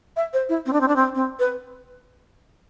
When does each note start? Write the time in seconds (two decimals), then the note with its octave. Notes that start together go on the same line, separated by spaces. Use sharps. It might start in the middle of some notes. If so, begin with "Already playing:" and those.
0.16 E5
0.33 C5
0.49 E4
0.66 C4
0.73 D4
0.81 C4
0.88 D4
0.96 C4
1.15 C4
1.39 B4